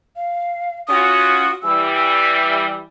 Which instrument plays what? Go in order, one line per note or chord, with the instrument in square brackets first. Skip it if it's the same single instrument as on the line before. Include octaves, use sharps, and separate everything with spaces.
[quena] F5
[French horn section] C#4 F4 F#4 [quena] D#6
[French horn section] E3 G3 [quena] E6
[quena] E6